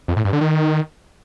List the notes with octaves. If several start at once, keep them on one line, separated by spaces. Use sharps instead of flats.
F2
A2
G2
D3
D#3